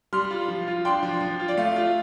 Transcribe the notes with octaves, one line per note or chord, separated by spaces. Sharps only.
G3 C6 F6
F4
F3
F4
D4 G5 C6
F3
F3
F4
D5
A3 F5
F4